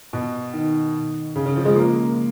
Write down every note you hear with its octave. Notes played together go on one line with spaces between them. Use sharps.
B2
D#3
C#3
C#3
F3
G#3
A#3